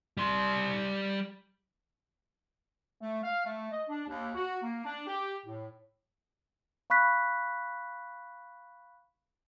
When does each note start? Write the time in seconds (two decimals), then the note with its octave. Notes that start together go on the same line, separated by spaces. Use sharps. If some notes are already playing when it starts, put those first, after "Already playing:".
0.17 G3 C6
3.01 A3
3.23 F5
3.46 A3
3.72 D#5
3.88 D4
4.08 D#2
4.34 F#4
4.62 A#3
4.85 D4
5.06 G4
5.46 A2
6.90 F5 B5 C#6 F#6 B6